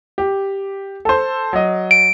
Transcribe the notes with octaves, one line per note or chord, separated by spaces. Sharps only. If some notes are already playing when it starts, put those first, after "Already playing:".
G4
A4 C5
F#3 D#5
D7